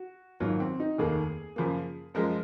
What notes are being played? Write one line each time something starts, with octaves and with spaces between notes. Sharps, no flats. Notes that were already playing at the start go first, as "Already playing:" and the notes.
Already playing: F#4
G#1 G#2 F#3 A#3 F4
C4
D#4
F1 D#2 D#3 A#3 G#4
F#2 C#3 F3 A#3
F#2 F3 G#3 A#4